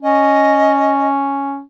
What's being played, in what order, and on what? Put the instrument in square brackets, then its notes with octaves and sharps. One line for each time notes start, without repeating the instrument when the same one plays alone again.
[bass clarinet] C#4 [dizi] D#5